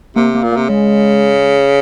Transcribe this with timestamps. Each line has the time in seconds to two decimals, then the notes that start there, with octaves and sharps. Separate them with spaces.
0.16 C3 A#3
0.34 A#3
0.43 A#2
0.52 C3 A#3
0.69 C#3 G#3